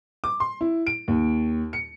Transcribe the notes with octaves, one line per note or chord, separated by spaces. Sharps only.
D6
C6
E4
D7
D#2
C#7